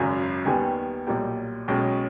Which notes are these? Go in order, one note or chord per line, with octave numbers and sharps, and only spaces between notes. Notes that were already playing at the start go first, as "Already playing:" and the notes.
Already playing: G#1 F#2 C#3 F#3 G#5
D#2 D#3 G3 B3 G#5
B1 A#2 G3 A#3 G5
B1 B2 G#3 C#4 G5